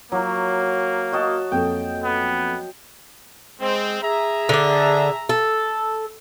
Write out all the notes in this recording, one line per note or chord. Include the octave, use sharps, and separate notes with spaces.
F#3 A#3
F#4 D#5 A5
F2 A#3 A4 G5
B3
G#3 C4
G#4 E5 A#5
D3 D4
A4